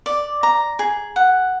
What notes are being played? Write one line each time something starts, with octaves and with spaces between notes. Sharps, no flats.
D5
A#5
G#4
F#5